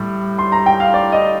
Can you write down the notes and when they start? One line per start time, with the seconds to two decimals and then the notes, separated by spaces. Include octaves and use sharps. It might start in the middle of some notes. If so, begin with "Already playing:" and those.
Already playing: A2 G3
0.39 C6
0.52 A#5
0.66 G5
0.80 F5
0.94 D5
1.12 D#5